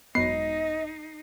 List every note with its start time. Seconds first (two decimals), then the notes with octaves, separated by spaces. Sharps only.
0.15 G#1 F#2 B3 D#4 D#5 C7